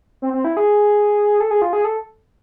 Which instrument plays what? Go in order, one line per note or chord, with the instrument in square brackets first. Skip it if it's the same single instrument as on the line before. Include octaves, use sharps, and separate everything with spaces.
[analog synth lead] C4
C4
E4
G#4
A4
G#4
F4
G#4
A4